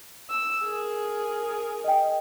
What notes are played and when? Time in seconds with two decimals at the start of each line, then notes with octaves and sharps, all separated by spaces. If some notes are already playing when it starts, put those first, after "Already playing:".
0.30 E6
0.64 G#4 A#4
1.84 D#5 G5